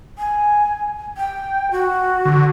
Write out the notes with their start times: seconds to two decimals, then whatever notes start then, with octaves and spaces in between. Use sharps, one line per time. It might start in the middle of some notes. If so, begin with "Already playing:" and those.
0.18 G#5
1.17 G5
1.71 F#4
2.25 D3